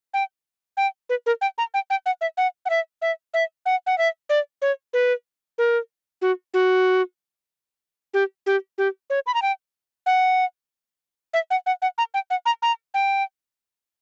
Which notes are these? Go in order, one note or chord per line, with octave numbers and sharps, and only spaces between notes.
G5
G5
B4
A#4
G5
A#5
G5
G5
F#5
E5
F#5
F#5
E5
E5
E5
F#5
F#5
E5
D5
C#5
B4
A#4
F#4
F#4
G4
G4
G4
C#5
B5
A#5
G5
F#5
E5
F#5
F#5
F#5
A#5
G5
F#5
A#5
A#5
G5